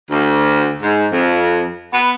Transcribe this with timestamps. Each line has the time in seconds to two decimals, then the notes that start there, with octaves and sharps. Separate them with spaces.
0.11 D2
0.81 G#2
1.12 F2
1.93 B3